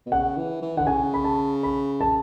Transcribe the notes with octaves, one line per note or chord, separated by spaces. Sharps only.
B2
C#3 F#5
E3
E3
D3 F#5
C#3 G#5
B5
A5
B5
A5